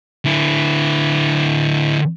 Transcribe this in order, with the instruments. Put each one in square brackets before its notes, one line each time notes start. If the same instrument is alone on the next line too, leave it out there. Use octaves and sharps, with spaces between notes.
[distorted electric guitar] D3 E4